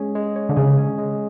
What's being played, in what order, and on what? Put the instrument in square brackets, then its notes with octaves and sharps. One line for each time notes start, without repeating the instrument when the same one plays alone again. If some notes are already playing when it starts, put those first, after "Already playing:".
Already playing: [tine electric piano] G#3 C#4 G#4 C#5
G#3
C#5
[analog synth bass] D3
[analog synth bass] C#3 [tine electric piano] G#4
[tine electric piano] C#4
G#3